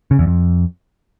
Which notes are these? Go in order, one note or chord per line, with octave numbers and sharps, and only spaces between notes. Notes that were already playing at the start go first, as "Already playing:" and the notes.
C#3
E2
F2